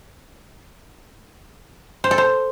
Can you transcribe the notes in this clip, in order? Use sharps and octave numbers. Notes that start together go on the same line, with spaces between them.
C5
A4
C5